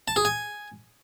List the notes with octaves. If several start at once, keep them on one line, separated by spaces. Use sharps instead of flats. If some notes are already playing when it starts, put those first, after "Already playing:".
A5
G#4
G#5